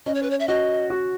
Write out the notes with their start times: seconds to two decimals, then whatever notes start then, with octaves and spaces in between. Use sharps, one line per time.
0.06 C#4 D#5
0.15 C#5
0.23 B4
0.30 C#5
0.40 E5
0.48 F#4 D#5
0.90 F#4